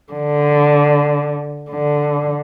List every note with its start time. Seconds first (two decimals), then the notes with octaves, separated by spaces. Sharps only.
0.12 D3
1.70 D3